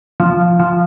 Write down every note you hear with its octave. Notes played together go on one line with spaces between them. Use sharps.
F3
F3